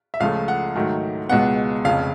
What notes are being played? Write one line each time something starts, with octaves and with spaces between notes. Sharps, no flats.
E5
C#2 C#3 F3 A3 F5
F#5
G#2 D#3 F#3 A3
C#2 B2 G#3 B3 F#5
F1 F2 C#3 F5